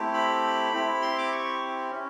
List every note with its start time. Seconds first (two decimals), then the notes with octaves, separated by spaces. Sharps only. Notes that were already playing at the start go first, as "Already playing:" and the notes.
Already playing: A3 C4 E4 G4
0.14 B5
0.73 C4 E4 G4
1.02 C6
1.18 D6
1.32 C#6
1.91 C#4